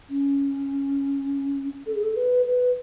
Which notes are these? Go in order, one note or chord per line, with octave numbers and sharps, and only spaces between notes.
C#4
A4
G#4
A4
B4
B4